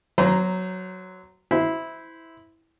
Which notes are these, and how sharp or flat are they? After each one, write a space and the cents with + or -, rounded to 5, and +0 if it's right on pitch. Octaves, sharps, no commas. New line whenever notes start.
F#3 +0 C5 -25 A#5 +0
E4 -10 C5 -25